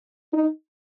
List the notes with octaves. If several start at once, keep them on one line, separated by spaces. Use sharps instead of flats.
D#4